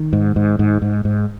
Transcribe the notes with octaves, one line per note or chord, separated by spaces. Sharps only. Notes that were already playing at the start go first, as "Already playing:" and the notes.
Already playing: D#3
G#2
G#2
G#2
G#2
G#2